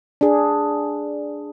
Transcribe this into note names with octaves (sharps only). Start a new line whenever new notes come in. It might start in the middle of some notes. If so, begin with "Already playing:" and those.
D4 G#4